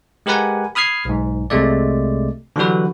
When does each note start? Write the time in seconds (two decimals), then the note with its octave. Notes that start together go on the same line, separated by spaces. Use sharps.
0.26 G#3 G4 A#4 B4 F#5 G#5
0.75 B5 D#6 F6 G#6 C7
1.05 B1 G#2
1.50 C2 C3 G#3 A3 D5
2.56 D3 E3 F#3 G3 F#4 B4